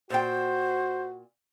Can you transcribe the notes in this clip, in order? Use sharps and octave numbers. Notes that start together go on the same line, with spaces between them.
A#2 F#4 C5 G5